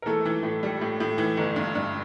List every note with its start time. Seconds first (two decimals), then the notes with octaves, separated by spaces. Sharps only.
0.02 A#4
0.06 E3 A3 A4
0.25 E3
0.43 A2
0.63 G3
0.81 A2
1.00 A2
1.18 E3
1.37 G1
1.56 G2
1.75 G2